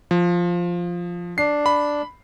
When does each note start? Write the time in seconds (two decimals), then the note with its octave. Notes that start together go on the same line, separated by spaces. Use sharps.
0.11 F3
1.38 D4 C7
1.66 B5